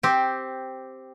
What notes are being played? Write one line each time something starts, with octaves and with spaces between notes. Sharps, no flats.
C4 G4